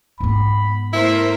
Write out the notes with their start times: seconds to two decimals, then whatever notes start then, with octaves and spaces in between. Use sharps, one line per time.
0.20 G#2 B3 B5
0.93 A3 E4 A#4 C5